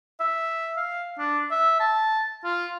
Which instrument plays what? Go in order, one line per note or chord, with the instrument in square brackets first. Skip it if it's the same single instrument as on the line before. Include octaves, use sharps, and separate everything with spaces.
[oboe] E5
F5
D4
E5
A5
F4